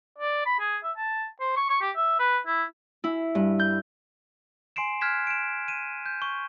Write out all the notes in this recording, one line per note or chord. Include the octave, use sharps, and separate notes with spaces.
D5
B5
G#4
E5
A5
C5
C#6
C#6
G4
E5
B4
E4
E4
G2
G6
G#5 C6 C7 D7 E7
F6 F#6 G#6 B6 E7
D7 E7
D#7 E7
G6
C#6